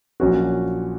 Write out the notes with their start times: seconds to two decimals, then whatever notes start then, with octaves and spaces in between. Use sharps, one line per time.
0.20 A#1 A#2 F#3 C#4 F#4